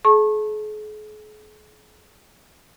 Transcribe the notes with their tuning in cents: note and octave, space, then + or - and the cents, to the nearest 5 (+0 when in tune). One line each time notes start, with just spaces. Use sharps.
G#4 +45 A5 +0 C#6 -30